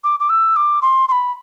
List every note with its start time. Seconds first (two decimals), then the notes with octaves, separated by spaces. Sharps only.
0.04 D6
0.20 D6
0.29 E6
0.56 D6
0.82 C6
1.08 C6
1.12 B5